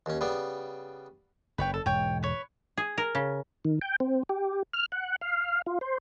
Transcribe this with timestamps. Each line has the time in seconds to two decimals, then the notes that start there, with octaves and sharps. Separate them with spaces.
0.06 D#2 C#4
0.21 C#3 G3 B3
1.58 F#1 B4 C#5 G5
1.74 A4
1.86 E1 G#2 C#5 G5
2.23 B4 C#5
2.77 G#4
2.98 A#4
3.15 C#3
3.65 D#3
3.82 G5
4.00 C4
4.29 G4
4.73 F6
4.92 F#5
5.21 F5
5.66 F4
5.81 C5